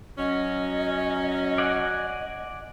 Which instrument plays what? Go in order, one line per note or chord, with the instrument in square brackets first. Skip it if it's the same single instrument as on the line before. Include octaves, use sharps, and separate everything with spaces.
[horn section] F#3 C#4 [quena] D#5
[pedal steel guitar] D5 F#5 G#5